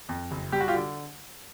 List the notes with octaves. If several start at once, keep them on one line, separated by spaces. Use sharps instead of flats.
F2
F#1
G3 G4
F#4
F4 G4
D3